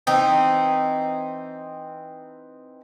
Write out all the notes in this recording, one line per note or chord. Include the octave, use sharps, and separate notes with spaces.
E3 C4 D#4